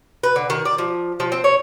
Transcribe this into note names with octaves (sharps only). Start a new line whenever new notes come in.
B4
D3
D#3
D5
F3
F3
C4
C#5